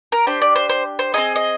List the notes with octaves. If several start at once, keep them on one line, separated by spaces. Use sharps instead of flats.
A#4
D4 G4 C5
D5
C5
C5
C5
C4 D#4 G#4 D#5
D#5